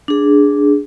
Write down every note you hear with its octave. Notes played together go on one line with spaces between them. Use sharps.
D4 G#4